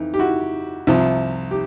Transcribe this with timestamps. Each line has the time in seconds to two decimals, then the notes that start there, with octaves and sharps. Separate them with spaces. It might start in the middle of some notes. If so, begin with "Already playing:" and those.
Already playing: F2 E3 D#4
0.14 G4
0.19 E4 F#4
0.87 C2 C3 F3
1.51 G4